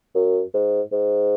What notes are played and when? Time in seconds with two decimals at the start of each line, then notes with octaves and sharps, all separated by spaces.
0.15 F#2
0.54 G#2
0.92 G#2